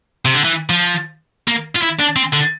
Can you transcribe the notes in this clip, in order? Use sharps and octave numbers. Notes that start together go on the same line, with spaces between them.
C3
D3
E3
F3
A#3
F4
E4
D4
C4
D3